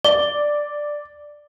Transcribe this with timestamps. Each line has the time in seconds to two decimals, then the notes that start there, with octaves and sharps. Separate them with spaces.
0.04 D5 G7